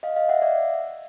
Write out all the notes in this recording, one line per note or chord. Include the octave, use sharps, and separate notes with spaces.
D#5 F5
D#5 F5
E5 F#5
D5 E5